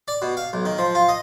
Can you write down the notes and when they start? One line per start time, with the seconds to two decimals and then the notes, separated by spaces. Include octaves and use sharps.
0.08 D5
0.22 B2
0.37 F5
0.53 B1
0.65 D#3
0.78 F3
0.95 F4
1.09 D#5